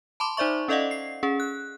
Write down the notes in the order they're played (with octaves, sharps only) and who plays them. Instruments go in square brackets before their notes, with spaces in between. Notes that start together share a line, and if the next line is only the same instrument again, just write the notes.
[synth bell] A5 B5 C6 D6
D#4 C5 D5 E5 C#6
C#4 A4 D5 D#5 F5 F#5
C7
C#4 G#4
F#6